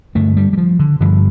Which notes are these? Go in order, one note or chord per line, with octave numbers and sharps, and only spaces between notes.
G2 D3 A3
G3
G3
F3
D3
G2 D3 F3